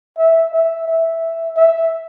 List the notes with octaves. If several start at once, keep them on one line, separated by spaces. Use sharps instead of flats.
E5
E5
E5
E5